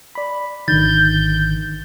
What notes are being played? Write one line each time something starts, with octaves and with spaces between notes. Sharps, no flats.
D5 B5
G#1 D3 D#3 G6 A6